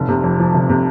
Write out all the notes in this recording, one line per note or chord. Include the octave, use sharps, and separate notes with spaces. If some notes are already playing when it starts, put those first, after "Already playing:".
Already playing: F1
C3
F2
F3
F1
C3